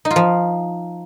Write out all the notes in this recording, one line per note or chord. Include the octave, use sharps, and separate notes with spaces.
D#4
F4
F3